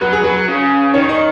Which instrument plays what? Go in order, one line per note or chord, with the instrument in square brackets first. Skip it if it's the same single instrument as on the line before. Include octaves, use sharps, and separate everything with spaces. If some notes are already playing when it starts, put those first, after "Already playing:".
[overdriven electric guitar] F#3 [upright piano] B4
[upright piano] G#4
[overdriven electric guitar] F#3 [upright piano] B4
[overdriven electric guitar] C#3
[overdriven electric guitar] D#3 [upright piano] C#5
[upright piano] D#5